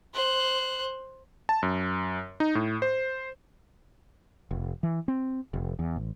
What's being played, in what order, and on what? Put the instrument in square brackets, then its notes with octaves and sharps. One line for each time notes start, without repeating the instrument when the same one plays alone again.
[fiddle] C5 F#6
[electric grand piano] A5
F#2
D#4
A2
C5
[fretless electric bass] F1
E3
C4
F1
E2
A1